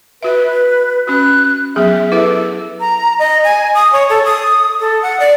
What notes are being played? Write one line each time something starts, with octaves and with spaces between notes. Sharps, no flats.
F#4 B4 E5
C#4 F#4 F#6
F#3 B3 G#4 E5
E4 A4 B4 E5
A#5
D#5
G#5
D#6
C#5
A4
D#6
A4
F#5
D5